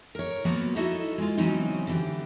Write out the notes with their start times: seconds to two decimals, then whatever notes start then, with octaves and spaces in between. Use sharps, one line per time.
0.15 A#4 C#5
0.45 F3 F#3 A#3 B3 F#4 F#5
0.76 D#4 E4 F#4 A4 D#5
1.18 G#3 F4
1.37 C#3 E3 F#3 C4 C#4 D#4
1.87 D3 E3 G4